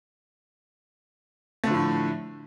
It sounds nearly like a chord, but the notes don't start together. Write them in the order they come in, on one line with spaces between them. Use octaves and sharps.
A3 D3 F3 A2